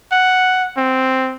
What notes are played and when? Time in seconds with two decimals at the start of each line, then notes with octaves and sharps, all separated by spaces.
0.12 F#5
0.77 C4